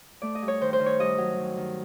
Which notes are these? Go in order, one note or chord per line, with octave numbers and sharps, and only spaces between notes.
A3 D5
D#5
G2
C#5
D#3 C5
C5
D#3
C#5
G2 D#5
F#3
D#3
D#3